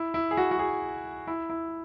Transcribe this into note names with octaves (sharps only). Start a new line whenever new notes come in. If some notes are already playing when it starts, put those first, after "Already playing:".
Already playing: E4
E4
G#4
F#4
F#4
G#4
E4
E4